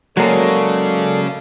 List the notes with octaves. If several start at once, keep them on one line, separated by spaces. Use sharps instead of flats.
C#3 F#3 G#3 A#3 A4 D5